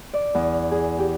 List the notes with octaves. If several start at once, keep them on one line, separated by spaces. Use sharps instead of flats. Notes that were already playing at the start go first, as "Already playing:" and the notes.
D5
E2
G#4
G4